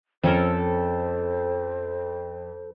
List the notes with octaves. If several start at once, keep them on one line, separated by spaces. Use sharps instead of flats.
F2 F3 C#4 A4 A#4 C5